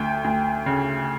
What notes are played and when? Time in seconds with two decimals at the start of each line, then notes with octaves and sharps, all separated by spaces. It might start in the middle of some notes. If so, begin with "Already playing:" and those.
Already playing: D2 G5
0.24 D2
0.66 C#3